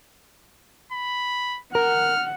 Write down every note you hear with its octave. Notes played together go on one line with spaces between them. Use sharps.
B5
A#4 F#5 F6